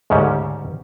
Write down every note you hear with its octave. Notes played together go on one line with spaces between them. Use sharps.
D2 G#2 C#3 G3 C#4